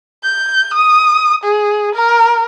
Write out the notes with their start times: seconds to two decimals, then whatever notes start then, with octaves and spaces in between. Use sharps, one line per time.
0.24 G6
0.73 D#6
1.44 G#4
1.95 A#4